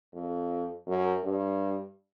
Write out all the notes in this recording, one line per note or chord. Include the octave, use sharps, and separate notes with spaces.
F2
F#2
G2